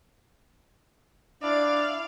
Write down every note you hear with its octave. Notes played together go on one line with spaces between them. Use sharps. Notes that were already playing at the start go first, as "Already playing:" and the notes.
D4 E4 D5 F5